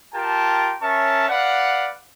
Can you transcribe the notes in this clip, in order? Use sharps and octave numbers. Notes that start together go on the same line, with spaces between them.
F4 G4 A#4 G5 A5
C#4 A#4 C#5 E5 A5 C#6
B4 D5 F5 F#5